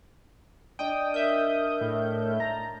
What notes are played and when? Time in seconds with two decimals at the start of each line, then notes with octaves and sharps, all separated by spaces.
0.79 D4 D#5 G5 A5 D#6
1.14 A#4 E5 G6
1.81 A2
2.40 A5 A#5